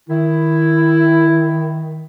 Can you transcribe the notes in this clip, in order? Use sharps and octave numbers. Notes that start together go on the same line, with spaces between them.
D#3 E4